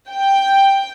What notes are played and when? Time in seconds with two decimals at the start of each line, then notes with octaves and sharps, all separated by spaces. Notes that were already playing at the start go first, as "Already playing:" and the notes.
0.10 G5